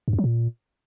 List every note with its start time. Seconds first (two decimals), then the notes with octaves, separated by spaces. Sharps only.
0.08 G2
0.13 F#2
0.19 F#3
0.24 A#2